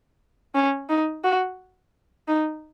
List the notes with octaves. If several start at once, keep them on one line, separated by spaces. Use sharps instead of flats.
C#4
D#4
F#4
D#4